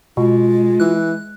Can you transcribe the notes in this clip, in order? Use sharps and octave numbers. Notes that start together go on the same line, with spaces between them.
B2 G#3 F4
E3 F#6